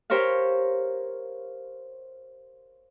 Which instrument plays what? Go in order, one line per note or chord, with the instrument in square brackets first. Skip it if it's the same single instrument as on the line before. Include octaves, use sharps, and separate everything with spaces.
[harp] G4 A#4 C5 C#5 F5